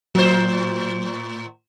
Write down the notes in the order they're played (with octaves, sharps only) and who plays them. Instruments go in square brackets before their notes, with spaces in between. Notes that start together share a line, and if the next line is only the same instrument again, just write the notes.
[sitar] A2 C5 [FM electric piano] F#3